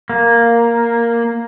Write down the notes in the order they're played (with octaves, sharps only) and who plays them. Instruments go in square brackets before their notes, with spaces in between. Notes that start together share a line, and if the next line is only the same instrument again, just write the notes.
[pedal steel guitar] A#3